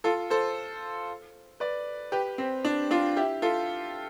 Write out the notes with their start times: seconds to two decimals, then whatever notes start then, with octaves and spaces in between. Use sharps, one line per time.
0.04 F4 A4
0.30 A4 C5
1.60 B4 D5
2.12 G4 B4
2.38 C4
2.65 D4
2.91 D4 F4
3.17 E4 G4
3.42 F4 A4